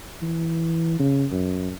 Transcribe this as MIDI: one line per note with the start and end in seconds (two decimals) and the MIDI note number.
0.22 0.96 52
0.99 1.25 49
1.32 1.71 42